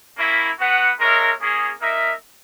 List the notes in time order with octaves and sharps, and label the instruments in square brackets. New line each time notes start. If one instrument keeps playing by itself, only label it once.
[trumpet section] A#3 C#4 E4
B3 F#4 B4 F#5
G#3 D#4 A#4 C#5 E5
A#3 C#4 G#4
A#3 D#4 A#4 E5